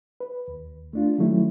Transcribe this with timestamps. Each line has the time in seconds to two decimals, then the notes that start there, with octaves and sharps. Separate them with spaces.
0.20 B4
0.48 D#2
0.93 A3 D4 F4
1.18 D#3 F#3 G3 A3 C#4 E4